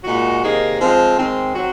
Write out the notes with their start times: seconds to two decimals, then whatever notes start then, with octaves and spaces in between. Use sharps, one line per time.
0.04 A#2 G#3 D#4 F#4
0.42 C3 D#3 A#3 D#4 G#4
0.80 F3 G#3 C4
1.18 D#3 G#3 C4
1.55 F#3 C4 F#4